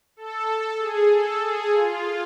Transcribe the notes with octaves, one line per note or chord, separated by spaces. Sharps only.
A4
G#4
A4
G#4
F4